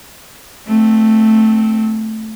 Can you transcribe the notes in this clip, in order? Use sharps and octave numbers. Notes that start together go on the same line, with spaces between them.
A3 C4